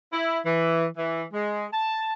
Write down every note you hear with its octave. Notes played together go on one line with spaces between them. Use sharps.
E4
E3
E3
G#3
A5